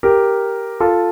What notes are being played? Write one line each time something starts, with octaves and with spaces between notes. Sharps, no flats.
G4 A#4
F4 A4